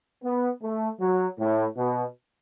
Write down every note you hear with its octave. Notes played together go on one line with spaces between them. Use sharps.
B3
A3
F#3
A2
B2